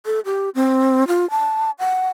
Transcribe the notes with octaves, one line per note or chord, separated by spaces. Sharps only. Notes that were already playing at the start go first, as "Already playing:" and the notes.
A4
G4
C4
F4
A5
F#5